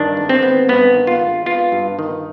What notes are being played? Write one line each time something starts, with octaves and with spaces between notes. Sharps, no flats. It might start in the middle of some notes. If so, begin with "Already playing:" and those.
Already playing: G2 D#3 D4
G#1
C4
B3
G2 B3
D#3
F4
G#1
B3 F4
G2
D#3